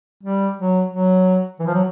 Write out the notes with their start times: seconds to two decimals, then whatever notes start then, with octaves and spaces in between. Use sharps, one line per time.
0.23 G3
0.57 F#3
0.91 F#3
1.60 E3
1.67 F3
1.75 F#3